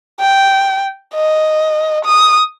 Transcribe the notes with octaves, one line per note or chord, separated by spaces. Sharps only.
G5
D#5
D#6